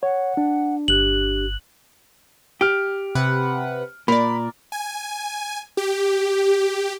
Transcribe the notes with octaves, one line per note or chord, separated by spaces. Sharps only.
C#5 F#5
D4
G1 G4 F#6 F#7
G4 F6 D7
C3 B4 F#5
A#2 A#4 D5 B5
G#5
G4